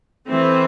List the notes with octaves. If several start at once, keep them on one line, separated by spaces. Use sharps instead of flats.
E3 A3 C4